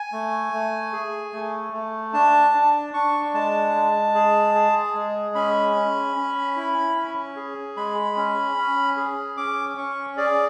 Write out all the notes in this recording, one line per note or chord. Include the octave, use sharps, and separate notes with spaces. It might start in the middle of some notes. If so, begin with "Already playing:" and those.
Already playing: G#5
A3
A3
G#4
A3
A3
D4 A5
D4
D4 C#6
G#3 A5
G#3
G#4
G#4
G#3
C#4 B5
C#4
C#4
E4
C#4
G#4
G#3 B5
C#4
C#4
G#4
C#4 D6
C#4 C#6
G#4 D5